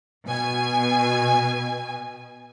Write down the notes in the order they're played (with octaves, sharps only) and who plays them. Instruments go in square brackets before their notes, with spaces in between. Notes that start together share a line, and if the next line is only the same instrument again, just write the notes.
[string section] B2 G#5